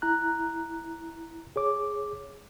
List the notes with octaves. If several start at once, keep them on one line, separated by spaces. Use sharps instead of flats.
E4 A#5 F#6
G#4 C#5 D6